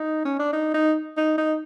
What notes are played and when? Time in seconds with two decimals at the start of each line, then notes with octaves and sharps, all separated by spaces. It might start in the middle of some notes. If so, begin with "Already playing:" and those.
Already playing: D#4
0.25 C#4
0.39 D4
0.53 D#4
0.74 D#4
1.17 D#4
1.38 D#4